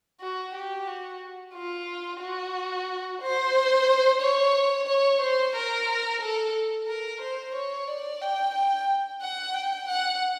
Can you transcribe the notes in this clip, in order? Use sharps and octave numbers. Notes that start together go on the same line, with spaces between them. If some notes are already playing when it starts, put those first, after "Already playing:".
F#4
G4
F#4
F4
F#4
C5
C#5
C#5
C5
A#4
A4
A#4
C5
C#5
D5
G5
G5
F#5
G5
F#5